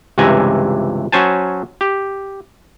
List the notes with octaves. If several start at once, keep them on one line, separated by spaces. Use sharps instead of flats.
C#2 G2 C3 E3 G#5 A#5
F#3 C#4 C5 G#5 A5
G4